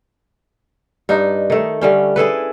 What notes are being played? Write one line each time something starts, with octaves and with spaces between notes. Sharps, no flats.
G2 D4 D#4
D#3 A3
D3 G3 C#4
E4 G#4 A4 B4